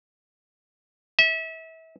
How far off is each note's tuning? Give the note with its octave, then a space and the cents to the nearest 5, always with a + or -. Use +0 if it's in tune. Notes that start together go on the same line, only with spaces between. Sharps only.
E5 -30